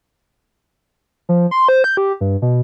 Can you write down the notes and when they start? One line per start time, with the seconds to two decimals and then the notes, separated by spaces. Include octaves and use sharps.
1.29 F3
1.51 C6
1.69 C5
1.84 G6
1.97 G4
2.21 G2
2.42 B2